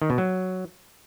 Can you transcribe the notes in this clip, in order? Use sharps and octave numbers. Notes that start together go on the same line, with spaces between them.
D#3
B2
F#3